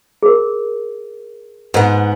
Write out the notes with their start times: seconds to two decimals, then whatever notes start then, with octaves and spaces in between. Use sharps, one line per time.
0.23 G#4 A#4
1.74 G#2 B3